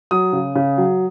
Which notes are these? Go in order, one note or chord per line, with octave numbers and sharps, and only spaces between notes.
F#3 D#6
C#3
C#3
F#3